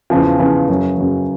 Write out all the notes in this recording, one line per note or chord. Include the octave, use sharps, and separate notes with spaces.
E2 C#3 F3
E2 C#3 F3
F#2 C#3 F#3
F#2 C#3 F#3